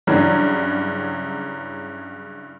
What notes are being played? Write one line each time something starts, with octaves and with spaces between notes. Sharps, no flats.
G2 C#3 E3 F#3